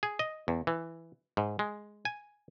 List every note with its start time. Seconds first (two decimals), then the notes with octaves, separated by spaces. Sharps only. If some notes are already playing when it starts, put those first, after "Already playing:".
0.03 G#4
0.19 D#5
0.48 E2
0.67 E3
1.37 G#2
1.59 G#3
2.05 G#5